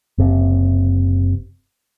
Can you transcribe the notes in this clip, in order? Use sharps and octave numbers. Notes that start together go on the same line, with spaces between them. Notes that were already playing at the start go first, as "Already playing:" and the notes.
F#1 C3